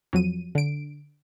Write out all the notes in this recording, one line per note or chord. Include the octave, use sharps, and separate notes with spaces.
F2 F#3 D#7
D3 D7